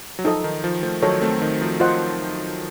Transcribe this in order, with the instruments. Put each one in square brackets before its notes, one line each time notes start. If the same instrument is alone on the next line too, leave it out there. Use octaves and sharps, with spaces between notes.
[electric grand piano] F#3
[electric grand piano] F3 [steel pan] D#4 A4 D#5
[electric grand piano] D#3
F3
F3 A3
[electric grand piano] D#3 F#3 [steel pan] D#4 A4 C#5
[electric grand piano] A3 C4
D#3
F3
[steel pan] F4 C5 D#5 F#5